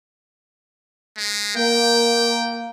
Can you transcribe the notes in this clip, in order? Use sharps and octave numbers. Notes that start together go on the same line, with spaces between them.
G#3
A#3 G5